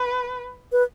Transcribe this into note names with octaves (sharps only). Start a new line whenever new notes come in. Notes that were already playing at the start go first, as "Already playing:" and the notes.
Already playing: B4
B4